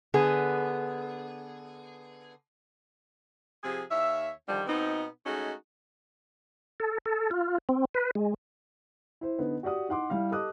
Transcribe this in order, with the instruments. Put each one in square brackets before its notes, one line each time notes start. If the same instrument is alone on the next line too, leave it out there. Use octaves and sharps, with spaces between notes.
[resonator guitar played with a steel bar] D3 B3 G#4
[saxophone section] C3 F3 G#4
D#2 C#5 E5
D3 D#3 F3 G3
B2 B3 C4 D#4
G#3 A3 C#4 D#4 F#4
[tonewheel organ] A4
A4
F4
C4
B4
G#3
[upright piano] E4 C5
D3 B3 D#4
F#4 G4 D5 F#5 D#6
D#4 F#5 C6 D6
G3 E4 F5
G4 A4 D#5 D6 D#6 F#6